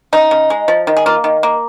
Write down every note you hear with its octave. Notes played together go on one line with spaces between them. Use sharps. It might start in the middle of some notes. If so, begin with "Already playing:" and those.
C#3 D#4
C#3
G#3
F3
D#3
G#4
A#3 F4
D#3
A#3